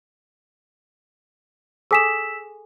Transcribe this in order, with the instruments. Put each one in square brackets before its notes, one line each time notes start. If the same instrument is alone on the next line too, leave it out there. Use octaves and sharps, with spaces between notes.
[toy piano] G#4 A4 G#5 [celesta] E6 B6 E7